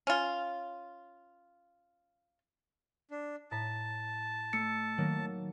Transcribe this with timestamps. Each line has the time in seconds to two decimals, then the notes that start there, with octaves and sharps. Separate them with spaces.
0.07 C#4 F4
3.11 D4
3.51 A2 A5 A#5 B6
4.53 A3 E6 C#7
4.98 D#3 F#3 A#3